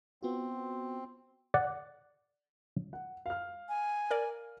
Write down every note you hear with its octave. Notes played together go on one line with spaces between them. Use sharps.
B3 C4 F4 F#4
D5 F#5
F#5
F5 F6
G#5
A#4 D5